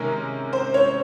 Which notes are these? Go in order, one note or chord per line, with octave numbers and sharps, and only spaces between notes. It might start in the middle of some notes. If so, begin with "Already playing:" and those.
Already playing: C3 D#3 G#3 C#4 A#4
C5
C#5